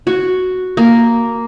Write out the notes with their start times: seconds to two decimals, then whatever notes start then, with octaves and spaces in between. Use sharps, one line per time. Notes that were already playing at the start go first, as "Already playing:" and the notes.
0.07 F#4
0.77 A#3